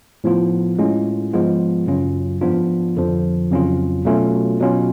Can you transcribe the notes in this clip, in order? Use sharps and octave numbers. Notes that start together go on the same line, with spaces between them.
A2 F3 B3 F4
A2 G#3 C#4 F4
G#2 F3 G#3 B3 F4
F#2 C#3 F#3 C#4 F4
G#2 F3 B3 D4 F4
F2 D3 F3
F2 C#3 F#3 C#4 F4
B2 F#3 A3 C#4 F4
B2 F#3 C#4 F4